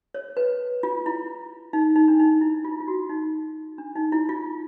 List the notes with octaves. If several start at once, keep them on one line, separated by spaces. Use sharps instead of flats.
C#5
B4
F4
E4
D#4
D#4
D4
D#4
E4
F4
E4
F4
F#4
D#4
D4
D#4
E4
F4